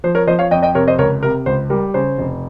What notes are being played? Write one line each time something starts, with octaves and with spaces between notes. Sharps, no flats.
F3 C5
A#4 C#5
F3 C5 D#5
C#5 F5
F2 D#5 G5
D#5 G5
C3 A#4 C#5
C5 D#5
C#2 A#4 C#5
C3 A#4
C#2 C5
G3 A#4
C#3 C5
F1